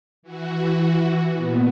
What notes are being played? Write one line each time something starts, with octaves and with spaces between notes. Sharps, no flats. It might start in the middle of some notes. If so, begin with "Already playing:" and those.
E3 F#4
A#2 B3